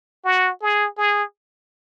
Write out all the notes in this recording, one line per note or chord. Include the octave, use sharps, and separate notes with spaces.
F#4
G#4
G#4